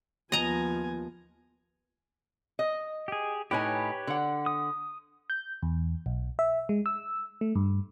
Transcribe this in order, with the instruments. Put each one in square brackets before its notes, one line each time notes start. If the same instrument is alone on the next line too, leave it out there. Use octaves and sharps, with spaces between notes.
[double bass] D#2 F3 [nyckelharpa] B3 G#5 [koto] D#5 A#5
[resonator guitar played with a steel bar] D#5
[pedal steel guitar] G4 G#4
[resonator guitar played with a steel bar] A2 D#4 G#5 [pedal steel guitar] G4 B4 C#5
[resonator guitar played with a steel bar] D3 F#5
[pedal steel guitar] D#6
[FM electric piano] G6
E2
B1
E5
G#3
E6
A3
G2